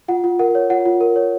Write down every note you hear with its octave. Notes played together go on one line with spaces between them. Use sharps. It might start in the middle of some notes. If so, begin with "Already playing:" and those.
F4 F#5
F4
A#4 F#5
C#5
F4 F#5
F4
A#4
C#5